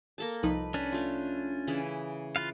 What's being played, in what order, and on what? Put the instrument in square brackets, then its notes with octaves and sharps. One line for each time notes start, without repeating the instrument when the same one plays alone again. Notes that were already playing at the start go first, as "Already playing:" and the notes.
[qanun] A#3 A4 A5
[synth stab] C2 F3 D#4 [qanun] B4
[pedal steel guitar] C#4 D4 [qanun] B4
[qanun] A3 F4
C#3 E3 E4
[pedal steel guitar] F4 B4 F5